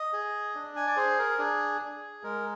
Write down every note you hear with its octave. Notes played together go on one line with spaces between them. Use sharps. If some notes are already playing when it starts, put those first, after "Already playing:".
Already playing: D#5
G#4
D4
G#5
D5
G#4 C5
A#4
D4 G#4
G#4
G#3 A#4